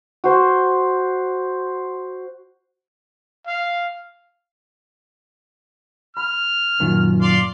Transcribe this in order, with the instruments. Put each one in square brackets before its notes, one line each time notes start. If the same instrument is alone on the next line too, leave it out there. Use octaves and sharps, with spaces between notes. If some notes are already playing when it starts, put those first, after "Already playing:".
[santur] F#4 C5
[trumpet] F5
[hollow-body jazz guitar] B5 [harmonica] F6
[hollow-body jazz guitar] F#2 A#2 D#3
[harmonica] D5 F5 C6